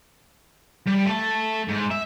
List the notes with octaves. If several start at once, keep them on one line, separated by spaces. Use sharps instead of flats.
G3
A3 A5
G#2
E5